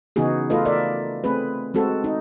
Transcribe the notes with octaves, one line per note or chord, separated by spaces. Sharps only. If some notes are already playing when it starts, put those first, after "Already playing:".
C#3 E3 B3 D#4 F#4 G#4
A3 F4 A4 B4 D#5
A#4 D5 E5
A3 C4 G#4 B4
G#3 C4 F#4 A4
D#4